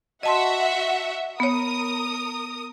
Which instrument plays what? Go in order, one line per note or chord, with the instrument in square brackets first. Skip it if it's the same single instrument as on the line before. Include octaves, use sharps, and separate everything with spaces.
[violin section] F#4 E5 F#5 [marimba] D#5 A5 C6
[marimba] B3 C#5 [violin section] A#4 D#6